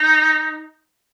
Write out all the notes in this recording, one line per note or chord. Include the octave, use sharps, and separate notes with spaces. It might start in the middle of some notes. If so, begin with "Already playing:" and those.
Already playing: D#4